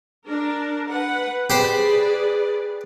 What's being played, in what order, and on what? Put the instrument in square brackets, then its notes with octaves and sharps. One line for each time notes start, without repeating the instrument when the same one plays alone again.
[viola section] D4 A#4
B4 F#5
[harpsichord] G4 C5 B5 [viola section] G#4 B4 D5